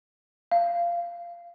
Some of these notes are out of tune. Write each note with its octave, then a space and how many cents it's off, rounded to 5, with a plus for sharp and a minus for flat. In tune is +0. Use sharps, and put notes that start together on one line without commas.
F5 -15